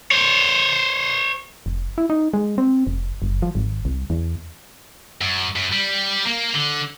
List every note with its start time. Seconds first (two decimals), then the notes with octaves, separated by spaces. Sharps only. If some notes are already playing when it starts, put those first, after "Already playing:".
0.11 C5 C#5
1.66 F1
1.98 E4
2.10 D#4
2.33 G#3
2.58 C4
2.87 F1
3.22 F#1
3.42 F3
3.55 G#1
3.85 C2
4.10 E2
5.21 F#2
5.56 F#2
5.72 G3
6.26 A#3
6.55 D3